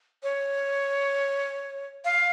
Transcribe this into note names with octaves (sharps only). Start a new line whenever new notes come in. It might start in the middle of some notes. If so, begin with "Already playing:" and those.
C#5
F5